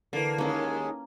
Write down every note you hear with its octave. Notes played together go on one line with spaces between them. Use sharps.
D3 E3 A#3
D#2 G#3 A#3 C#4